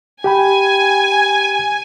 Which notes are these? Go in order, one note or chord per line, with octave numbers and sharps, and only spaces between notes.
G4 G5 G#5 B5